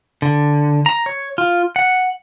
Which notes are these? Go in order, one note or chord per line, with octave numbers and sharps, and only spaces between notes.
D3
A#5
C#5
F4
F#5